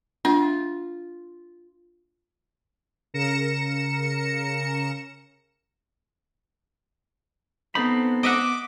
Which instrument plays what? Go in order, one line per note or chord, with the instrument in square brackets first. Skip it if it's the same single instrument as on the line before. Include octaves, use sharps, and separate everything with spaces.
[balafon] A#3 D4 [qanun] F4
[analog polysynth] C#3 A#4 A#6 C#7 E7
[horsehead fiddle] B3 [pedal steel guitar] C4 A4 B5 [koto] D#4
[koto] D#5 E5 F#5 [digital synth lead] D6